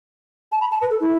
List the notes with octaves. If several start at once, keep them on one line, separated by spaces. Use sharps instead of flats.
A5
B5
A5
B4
A4
E4